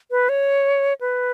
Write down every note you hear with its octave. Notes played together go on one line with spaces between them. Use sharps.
B4
C#5
B4